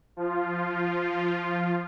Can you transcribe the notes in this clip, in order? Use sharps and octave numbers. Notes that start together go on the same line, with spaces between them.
F3 F4